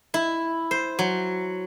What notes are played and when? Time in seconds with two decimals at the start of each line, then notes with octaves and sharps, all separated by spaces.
0.14 E4
0.71 C5
0.99 F#3